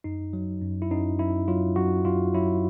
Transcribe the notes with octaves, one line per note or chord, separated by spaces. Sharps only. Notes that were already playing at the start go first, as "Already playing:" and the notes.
F#2 D#4
F#3
F#2
E4
F#2 D#4
F#2 E4
F#3 F4
F#2 F#4
F#2 F4
F#3 E4